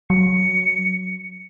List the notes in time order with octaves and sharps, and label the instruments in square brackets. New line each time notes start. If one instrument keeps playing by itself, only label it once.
[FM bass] F#3 [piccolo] C#7